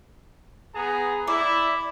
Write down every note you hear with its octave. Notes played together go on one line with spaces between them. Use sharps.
B3 G#4 A#5
E4 D5